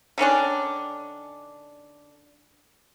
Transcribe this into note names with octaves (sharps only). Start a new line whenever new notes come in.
D3 D#3 C#4 D4